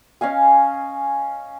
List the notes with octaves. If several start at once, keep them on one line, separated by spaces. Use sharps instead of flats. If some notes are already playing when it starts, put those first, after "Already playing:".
C#4 D#5 F5 G#5